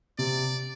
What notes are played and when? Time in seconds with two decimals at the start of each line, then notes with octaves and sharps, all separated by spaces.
0.19 C3 D5